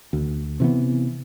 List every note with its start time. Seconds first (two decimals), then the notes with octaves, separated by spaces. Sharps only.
0.13 D2
0.60 C3 E3 B3